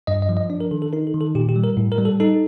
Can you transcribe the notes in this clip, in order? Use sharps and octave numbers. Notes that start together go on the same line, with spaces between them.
G2 D#5
D#5
F3
D#5
D4 D5
A#4
D#3 A4
A4
D#4 A#4
A4
D#3
A4
A#2 G4
G4
G3
A#4
A2
A#4
G3
A4
D#4 A4